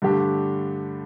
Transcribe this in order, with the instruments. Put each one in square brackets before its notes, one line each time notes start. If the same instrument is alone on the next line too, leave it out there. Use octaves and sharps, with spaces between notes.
[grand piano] G2 D3 A3 D4 G4